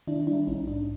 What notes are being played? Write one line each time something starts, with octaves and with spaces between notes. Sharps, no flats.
D#3 D4 E4
G3 D4 E4
A#1 C#4 D#4
G#2 D4